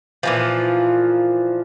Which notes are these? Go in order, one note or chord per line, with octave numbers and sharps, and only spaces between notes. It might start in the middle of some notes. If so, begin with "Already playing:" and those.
A#2 E3 F3